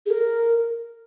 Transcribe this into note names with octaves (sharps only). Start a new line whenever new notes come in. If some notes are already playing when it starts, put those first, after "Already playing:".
G#4
A#4